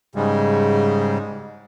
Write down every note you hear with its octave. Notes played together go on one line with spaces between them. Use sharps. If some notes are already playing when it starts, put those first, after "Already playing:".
G#2 C#3 G3 G#3